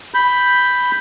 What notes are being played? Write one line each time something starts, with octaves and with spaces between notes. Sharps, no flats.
B5 G6